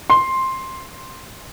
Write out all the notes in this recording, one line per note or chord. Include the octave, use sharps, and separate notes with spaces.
C6